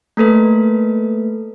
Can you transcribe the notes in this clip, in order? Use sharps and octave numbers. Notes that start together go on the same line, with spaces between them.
A3 A#3 A4 B4